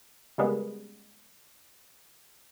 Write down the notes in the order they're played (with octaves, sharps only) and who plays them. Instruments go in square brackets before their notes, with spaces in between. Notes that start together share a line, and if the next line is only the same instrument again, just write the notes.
[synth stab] C#3 G3 G#3 A#3 B3